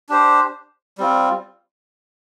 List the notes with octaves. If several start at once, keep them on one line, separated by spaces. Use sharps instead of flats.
D4 G4 C5
G3 C4 F4